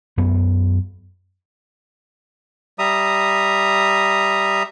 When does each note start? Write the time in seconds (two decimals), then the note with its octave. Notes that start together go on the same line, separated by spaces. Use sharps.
0.17 F#2 B3
2.79 G3 E5 A#5 D#6